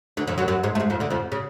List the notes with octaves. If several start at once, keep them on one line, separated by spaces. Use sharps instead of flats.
D2 D3
F2 F3
F#2 F#3
F#2 F#3
G#2 G#3
A3
G#2 G#3
F2 F3
D2 D3
F2 F3
C#3